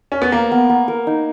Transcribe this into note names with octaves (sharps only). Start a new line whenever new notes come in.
C#4
B3
A#3 A#4
B3
B3
A#4
D#4